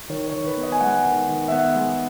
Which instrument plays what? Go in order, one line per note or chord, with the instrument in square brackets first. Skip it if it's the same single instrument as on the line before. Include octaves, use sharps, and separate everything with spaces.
[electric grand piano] D#3 C#5
C#5
D#3
B4
B3
D#5
G#5
G#3 F#5
D#3
D#3
E5
B3 F#5
G#3